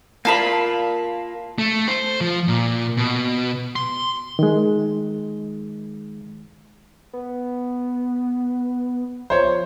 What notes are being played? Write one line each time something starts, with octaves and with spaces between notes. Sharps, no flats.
A#3 F4 A#4 F5 A5 B5
A3
C5
F3
A#2
B2
C6
D#3 G#3
B3
F3 C5 C#5